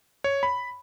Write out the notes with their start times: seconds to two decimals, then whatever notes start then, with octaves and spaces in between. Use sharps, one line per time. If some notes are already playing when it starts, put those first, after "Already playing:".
0.24 C#5
0.43 B5